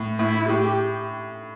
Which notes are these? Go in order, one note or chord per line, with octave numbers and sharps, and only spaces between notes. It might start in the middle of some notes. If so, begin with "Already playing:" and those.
Already playing: A2
A2 E4
A2 G4